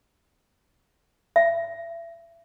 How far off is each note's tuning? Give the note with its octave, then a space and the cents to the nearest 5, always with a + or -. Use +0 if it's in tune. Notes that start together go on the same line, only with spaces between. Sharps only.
E5 +30